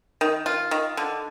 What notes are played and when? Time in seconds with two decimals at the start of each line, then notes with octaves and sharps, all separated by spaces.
0.21 D#3
0.46 F4
0.71 D#3
0.97 D3